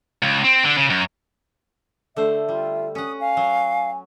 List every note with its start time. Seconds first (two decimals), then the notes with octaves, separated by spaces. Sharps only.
0.23 C#2
0.44 C4
0.64 D3
0.77 C#3
0.90 F#2
2.16 D3 A3 C5 E5
2.49 G3 F4
2.95 C#4 F#5 D#6
3.20 F5 G#5
3.37 F#3